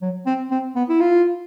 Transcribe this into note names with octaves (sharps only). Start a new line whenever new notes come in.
F#3
C4
C4
B3
E4
F4